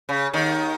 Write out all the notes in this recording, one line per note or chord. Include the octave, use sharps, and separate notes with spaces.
C#3
D#2 D#3